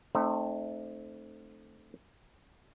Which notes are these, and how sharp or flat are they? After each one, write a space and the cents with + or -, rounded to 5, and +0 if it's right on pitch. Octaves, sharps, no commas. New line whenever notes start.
A3 +0 C4 +0 D#4 -40